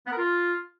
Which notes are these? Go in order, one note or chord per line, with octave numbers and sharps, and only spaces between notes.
B3
A#4
F4